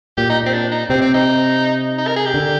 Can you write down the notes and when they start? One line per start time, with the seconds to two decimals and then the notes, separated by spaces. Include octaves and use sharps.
0.18 A#2 G4
0.30 D#4
0.46 C4
0.54 D4
0.71 D#4
0.90 C3 C4
1.02 C4
1.14 D#4
1.98 D#4
2.07 A#4
2.16 G#4
2.26 G4
2.34 D3